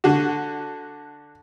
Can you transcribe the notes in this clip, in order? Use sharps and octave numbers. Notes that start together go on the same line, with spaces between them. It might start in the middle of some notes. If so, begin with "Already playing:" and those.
D3 F#4